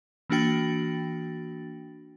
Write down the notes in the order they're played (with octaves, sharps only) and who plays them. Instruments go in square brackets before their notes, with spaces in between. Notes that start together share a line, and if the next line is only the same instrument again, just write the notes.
[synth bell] E3 A#3 D4 F#4 G5 A6